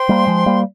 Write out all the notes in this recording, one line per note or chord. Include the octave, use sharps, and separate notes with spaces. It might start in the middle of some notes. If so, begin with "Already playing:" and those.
Already playing: C5 G5 C6
G3 A#3
F3 G#3
G3 A#3